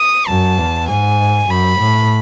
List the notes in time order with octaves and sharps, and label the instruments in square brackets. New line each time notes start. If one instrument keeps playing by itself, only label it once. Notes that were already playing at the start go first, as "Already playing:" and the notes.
Already playing: [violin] D#6
[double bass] F#2 [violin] A5
[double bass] E2
[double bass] G#2 [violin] G#5
[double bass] F#2 [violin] B5
[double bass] A2